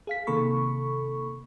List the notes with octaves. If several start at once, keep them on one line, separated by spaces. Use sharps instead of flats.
G#4 F5 B6
C3 D#3 A#3 A4 B5 C#6